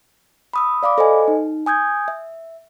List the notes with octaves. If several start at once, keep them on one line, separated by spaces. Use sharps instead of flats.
B5 D#6 E6
D5 F5 B5 D6
A4 C5 D#5 G#5
D#4
G#5 D#6 G6 G#6
E5